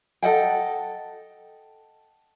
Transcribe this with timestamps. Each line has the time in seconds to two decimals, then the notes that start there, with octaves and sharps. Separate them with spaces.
0.22 A4 D#5 F#5 G5